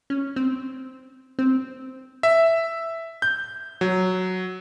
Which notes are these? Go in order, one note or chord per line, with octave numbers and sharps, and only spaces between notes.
C#4
C4
C4
E5
G6
F#3